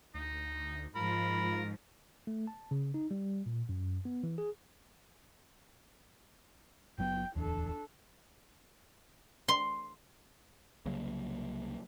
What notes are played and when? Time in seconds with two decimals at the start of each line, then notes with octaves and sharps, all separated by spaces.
0.15 D2 D#4
0.96 G#2 F3 F4 A#4 B5
2.27 A3
2.47 A5
2.71 C#3
2.94 D#4
3.11 G3
3.46 A#2
3.69 F#2
4.05 B3
4.23 E3
4.38 G#4
6.99 F#1 F#3 B3 G5
7.36 D1 E2 D4 A4
9.48 C6
10.86 C2 C#3 F#3 A#3